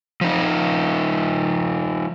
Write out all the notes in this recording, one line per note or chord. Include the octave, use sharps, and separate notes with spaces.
F3 D#4